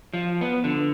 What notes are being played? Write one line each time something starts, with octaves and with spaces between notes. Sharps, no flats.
F3
B3
D3